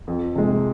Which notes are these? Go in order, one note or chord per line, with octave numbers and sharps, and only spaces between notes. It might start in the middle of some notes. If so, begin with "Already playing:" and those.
F2
C3 G#3